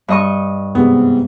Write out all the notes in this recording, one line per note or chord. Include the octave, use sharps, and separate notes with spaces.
G2 D#5 C#6
G#2 C3 B3